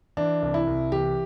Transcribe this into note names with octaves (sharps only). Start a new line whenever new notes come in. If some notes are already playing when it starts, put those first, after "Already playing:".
E3 D4
C2
E4
C2
E3 G4